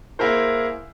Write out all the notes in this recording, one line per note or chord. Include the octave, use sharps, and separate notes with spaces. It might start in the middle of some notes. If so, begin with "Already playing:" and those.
A#3 E4 G#4 A#4 C5